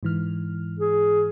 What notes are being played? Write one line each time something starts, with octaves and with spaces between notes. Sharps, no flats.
G#2 E3 F6
G#4